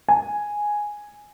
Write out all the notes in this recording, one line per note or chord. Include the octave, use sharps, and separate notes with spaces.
G#5